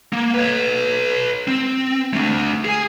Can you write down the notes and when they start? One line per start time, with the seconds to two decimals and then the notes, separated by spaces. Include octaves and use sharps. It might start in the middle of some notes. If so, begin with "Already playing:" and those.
0.13 A#3
0.34 B4 C#5
1.48 C4
2.13 A3 D4
2.65 G#4 G#5